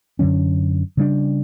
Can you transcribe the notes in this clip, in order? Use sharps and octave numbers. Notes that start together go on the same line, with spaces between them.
F#2 D3 F#3 C#4
C#3 G3 A#3 D4